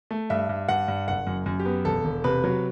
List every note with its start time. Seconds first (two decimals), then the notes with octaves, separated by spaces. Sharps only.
0.11 A3
0.30 G2 E5
0.49 G2
0.69 G2 F#5
0.88 G2
1.07 F#1 F#5
1.27 F#2
1.46 F#2
1.59 G4
1.65 B3
1.85 E1 A4
2.05 E1
2.24 C3 B4
2.44 F#3